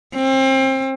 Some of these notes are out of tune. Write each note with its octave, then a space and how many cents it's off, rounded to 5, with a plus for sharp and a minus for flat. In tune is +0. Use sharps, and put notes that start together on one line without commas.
C4 +30